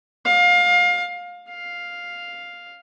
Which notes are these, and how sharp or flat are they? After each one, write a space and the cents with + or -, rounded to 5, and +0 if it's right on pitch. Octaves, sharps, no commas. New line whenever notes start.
F5 +25
F5 +5